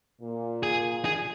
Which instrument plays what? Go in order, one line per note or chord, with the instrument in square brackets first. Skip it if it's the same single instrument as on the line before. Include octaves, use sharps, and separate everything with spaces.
[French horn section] A#2
[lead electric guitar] G#4
G#4